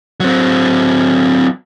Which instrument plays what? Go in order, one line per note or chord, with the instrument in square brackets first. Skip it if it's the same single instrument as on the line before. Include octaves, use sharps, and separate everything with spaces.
[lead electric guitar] F#3 C4